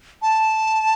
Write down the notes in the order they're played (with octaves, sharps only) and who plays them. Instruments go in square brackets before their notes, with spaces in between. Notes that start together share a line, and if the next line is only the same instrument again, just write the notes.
[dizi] A5